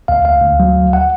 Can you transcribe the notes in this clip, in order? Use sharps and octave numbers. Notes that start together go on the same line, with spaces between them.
D2 F5
D2 F5
D2
F#3
D2
F#5